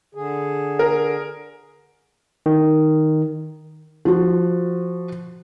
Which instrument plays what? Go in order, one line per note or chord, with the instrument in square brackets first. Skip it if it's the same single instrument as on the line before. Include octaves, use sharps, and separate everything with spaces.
[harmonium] D3 G#4
[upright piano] A#4
[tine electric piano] D#3
[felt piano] F3 F#4